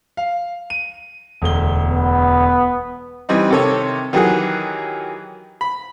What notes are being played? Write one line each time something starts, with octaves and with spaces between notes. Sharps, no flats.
F5
D#7
E1 D2 G7
B3
E3 G3 C4 D#4
C3 D#3 A4 C#5
D#3 E3 F#3 G4 G#4 F#5
B5